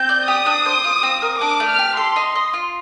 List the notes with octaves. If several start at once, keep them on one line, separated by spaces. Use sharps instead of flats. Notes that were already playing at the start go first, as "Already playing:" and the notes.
Already playing: C4 G6
D5
G4 D#6
D4
C5
F4
C4
A#4
D4 D6
A3
F6
G4
A4 C6
D#4
D#5
F4